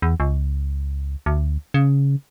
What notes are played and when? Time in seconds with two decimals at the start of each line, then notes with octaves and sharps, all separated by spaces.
0.02 E2
0.20 C#2
1.26 D2
1.74 C#3